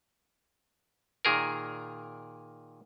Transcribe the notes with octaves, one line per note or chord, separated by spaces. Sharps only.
A#2 D#3 G#4 A#4